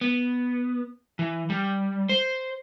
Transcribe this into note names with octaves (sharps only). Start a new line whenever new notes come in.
B3
E3
G3
C5